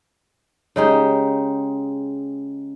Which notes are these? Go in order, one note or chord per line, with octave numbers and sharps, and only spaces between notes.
C#3 G#3 D#4 G4